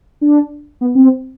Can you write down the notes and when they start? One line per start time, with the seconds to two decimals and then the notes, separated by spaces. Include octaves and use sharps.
0.21 D4
0.81 B3
0.95 C4